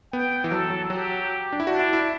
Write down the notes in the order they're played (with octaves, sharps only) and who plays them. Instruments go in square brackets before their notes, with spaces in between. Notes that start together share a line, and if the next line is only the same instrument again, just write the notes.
[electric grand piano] B3 [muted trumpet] G5
[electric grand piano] E3
[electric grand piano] F#3 [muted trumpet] A4
[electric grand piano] F#3
[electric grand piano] F#3 [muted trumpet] G4
[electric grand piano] D4
E4
[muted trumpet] D4 [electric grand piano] F#4
[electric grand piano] E4
E4